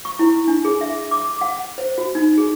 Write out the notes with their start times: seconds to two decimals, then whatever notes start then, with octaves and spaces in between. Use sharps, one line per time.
0.05 C#6
0.19 E4
0.48 D4
0.65 G#4
0.81 E5
1.11 D6
1.41 F#5
1.78 C5
1.98 F#4
2.15 D#4
2.38 G#4